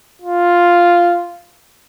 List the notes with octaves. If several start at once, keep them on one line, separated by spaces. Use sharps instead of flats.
F4